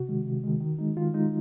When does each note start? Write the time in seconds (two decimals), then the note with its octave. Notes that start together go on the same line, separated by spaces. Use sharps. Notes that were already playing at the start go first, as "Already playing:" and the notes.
Already playing: C3 F#4
0.08 D#3 G#3
0.25 C3
0.44 D#3 G#3
0.61 D#3
0.78 G#3 D#4
0.97 D#3 F4
1.14 G#3 D#4